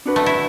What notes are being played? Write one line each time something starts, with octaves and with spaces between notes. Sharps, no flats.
D4 F#4 B4
A3
E4